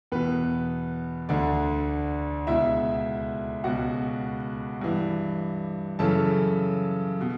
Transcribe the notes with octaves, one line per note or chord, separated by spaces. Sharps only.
E2 B2 B3 B4
D2 D3 D4 D5
C#2 B2 E4 E5
C#2 B2 F#4 F#5
G2 E3
F#2 C#3 E3 A4 A5
B2